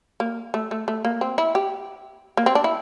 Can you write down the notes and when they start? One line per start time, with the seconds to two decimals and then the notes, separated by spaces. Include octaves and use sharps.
0.20 A#3
0.54 A3
0.71 A3
0.88 A3
1.05 A#3
1.21 C4
1.38 E4
1.55 G4
2.37 A#3
2.46 C4
2.55 D4
2.64 E4